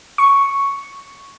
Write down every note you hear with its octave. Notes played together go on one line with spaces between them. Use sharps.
C#6